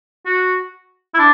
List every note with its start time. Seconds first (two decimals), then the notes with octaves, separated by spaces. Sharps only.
0.26 F#4
1.14 E4
1.18 D4